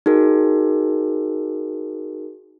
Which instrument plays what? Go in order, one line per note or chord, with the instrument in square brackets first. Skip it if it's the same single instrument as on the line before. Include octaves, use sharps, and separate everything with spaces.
[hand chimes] D#4 F#4 G#4 A#4